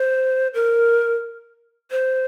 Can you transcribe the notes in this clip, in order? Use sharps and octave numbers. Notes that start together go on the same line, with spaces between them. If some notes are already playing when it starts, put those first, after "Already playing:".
Already playing: C5
A#4
C5